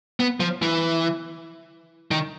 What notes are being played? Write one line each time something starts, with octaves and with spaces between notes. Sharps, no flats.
B3
F3
E3
D#3